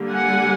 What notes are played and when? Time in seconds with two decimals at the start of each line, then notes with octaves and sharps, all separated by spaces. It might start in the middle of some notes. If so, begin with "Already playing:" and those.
Already playing: D3 G3 A#3
0.10 F#5 G#5